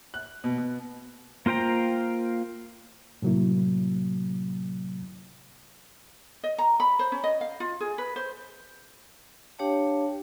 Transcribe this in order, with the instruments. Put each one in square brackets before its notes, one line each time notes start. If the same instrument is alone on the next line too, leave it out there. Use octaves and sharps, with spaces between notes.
[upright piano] F#6
B2
B2
[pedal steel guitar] A#3 F4 C5 G5 A#5
[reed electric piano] A2 C3 F#3 A#3 E4
[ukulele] D#5
A#5
B5
C5
C#4
D#5
F5
F4
G#4
B4
C5
[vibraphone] D4 G4 C#5 F5 G5 A5